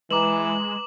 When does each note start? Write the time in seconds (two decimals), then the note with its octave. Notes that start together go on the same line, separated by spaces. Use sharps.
0.11 E3 G#3 B4 A#5 D6 E7 F#7